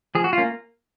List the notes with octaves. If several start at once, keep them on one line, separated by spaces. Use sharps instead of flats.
F3 G#4
F#4
F4
A#3 C#4